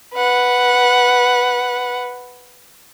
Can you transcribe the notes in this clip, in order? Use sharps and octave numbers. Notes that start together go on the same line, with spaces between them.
B4 F#5